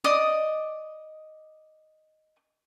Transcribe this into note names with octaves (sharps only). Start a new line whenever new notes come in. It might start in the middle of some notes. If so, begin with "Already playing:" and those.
D5 D#5 D#6